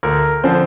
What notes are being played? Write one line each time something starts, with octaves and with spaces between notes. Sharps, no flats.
D2 A#4
D3 F3 C4 C5